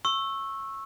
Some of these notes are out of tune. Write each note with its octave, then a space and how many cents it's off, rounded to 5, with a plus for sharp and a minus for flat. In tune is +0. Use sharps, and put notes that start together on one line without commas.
C#6 -20 E6 +0